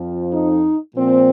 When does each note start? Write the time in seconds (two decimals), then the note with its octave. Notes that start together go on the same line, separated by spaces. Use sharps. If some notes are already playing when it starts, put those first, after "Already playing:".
Already playing: F2 F3
0.32 D#4
0.96 A#2 F3 C4